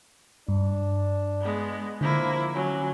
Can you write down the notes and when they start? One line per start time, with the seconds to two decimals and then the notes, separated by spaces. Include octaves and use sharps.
0.48 G2 D4
1.40 G#3 B3
2.01 D3 F3 A#3 E4
2.54 F#3 C#4